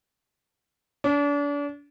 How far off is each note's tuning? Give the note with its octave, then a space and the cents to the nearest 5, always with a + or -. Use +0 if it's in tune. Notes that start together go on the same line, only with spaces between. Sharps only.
D4 -35